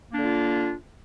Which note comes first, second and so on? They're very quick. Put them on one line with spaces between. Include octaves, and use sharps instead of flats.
A#3 D4 D3 F4